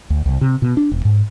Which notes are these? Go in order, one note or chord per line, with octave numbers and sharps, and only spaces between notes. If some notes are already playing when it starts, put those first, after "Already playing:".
D2
C2
C3
B2
D4
E1
G#2